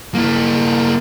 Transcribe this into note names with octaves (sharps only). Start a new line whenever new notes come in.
A#3 E4